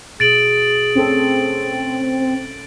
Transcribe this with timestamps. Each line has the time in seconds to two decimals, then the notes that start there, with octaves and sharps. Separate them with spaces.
0.20 B2 G#4 A6 D7 F#7
0.95 C4 C#4 A4